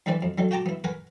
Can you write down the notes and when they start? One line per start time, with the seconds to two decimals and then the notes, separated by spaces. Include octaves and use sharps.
0.06 C2 E3 C4 B4 D5
0.22 F2
0.38 D3 D#3 F#3
0.51 F#4 G5 A5 A#5 D6
0.66 B3 E4
0.84 A#4 B4 F#5 G#5